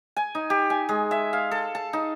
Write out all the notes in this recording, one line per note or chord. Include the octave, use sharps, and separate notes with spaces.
G#5
D#4
G4
G#5
G#3
E5
F5
A4
A5
D#4